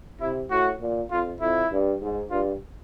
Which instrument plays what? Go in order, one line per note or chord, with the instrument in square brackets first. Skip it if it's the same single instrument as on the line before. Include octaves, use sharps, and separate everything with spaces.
[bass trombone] C3 [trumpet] E4
[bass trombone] A2 [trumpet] F#4
[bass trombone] A#2
[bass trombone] F2 [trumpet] F4
[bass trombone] F2 [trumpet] E4
[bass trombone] G2
G#2
[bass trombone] G2 [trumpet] F4